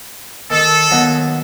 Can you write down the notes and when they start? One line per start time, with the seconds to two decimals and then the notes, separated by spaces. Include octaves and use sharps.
0.51 D#3 A4
0.91 D#2 F#3 B3